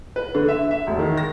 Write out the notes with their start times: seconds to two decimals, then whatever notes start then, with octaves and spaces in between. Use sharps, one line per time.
0.16 B4
0.35 D3
0.48 E5
0.71 E5
0.87 E1
0.99 D#3
1.17 A#6